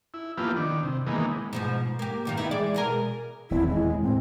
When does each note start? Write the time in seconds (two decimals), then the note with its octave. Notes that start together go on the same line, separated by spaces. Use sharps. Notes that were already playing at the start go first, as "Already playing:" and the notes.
0.14 E4
0.38 F3 A#3 B3 E4 F4 G4
0.57 D#3 D4
0.83 C3
1.07 D#3 E3 G#3 A#3 B3 D#4
1.53 G#2 B2 F3
1.99 A#3 G4
2.25 G2 D#3 F4
2.37 B3 D#4 E4
2.51 E3 G#3 D5
2.74 B2 G#4 A#4
3.51 D#1 E2 C4 E4
3.68 G#3
4.03 A2 C4